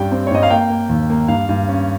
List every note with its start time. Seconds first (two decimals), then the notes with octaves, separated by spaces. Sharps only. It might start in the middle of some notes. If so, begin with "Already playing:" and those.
Already playing: G2 G3 C#4 G5
0.11 C4
0.27 C#5
0.31 G2 D#5
0.43 F5
0.50 A#3 G5
0.70 A#3
0.89 D#2
1.10 A#3
1.28 G2 F5
1.49 G2
1.68 C#4